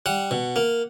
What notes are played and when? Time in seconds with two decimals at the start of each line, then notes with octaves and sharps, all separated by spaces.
0.06 G3 F#5
0.31 B2
0.56 A#3